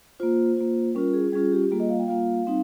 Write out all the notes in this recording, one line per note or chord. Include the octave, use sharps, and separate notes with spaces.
A#3 F4 C5
A#3 F4
G3 C#4 F4 A#4
G#4
G3 C#4 F4 G#4
G4
G3 A#3 F4 G#4
D#5
F5
G5
G3 A#3 F4 F5
G3 C4 D#4